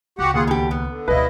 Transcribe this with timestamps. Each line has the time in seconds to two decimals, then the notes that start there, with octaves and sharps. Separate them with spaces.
0.19 C#2 F#4 G4 F#5
0.34 D#2 F4 G#4 F#5
0.47 E2 B2 G4
0.71 B3
0.88 D3
1.08 D2 B2 G3 E4 B4 D#5 F5